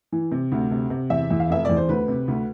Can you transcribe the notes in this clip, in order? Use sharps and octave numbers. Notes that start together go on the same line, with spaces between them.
E3
C3
D2
C3
C3
E2 E5
E2
F5
F1 E5
E2 D5
C5
D2 B4
C3
D2